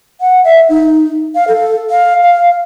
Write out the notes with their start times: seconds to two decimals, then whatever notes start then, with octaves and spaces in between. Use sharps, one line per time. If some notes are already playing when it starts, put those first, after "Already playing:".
0.21 F#5
0.44 E5
0.69 D#4
1.35 F5
1.48 A4
1.90 F5
2.23 F5